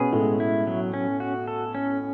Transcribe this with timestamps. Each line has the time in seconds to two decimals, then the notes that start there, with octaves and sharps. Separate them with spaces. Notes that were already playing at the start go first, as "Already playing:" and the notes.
Already playing: B2 B3 C#4 G#4
0.13 A2 G#3 A3
0.40 E4
0.67 F#3
0.94 C#4
1.20 F#4
1.47 A4
1.75 C#4